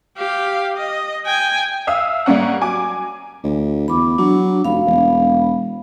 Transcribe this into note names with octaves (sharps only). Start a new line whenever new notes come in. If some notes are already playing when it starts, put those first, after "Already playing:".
G4 F5
D#5
G5 G#5
E5 F5 D#6 E6
G3 A#3 C#4 F#5
F#3 G#5 D6
D2
E2 B5 D6
F#3 D4
F1 F5 B5
E1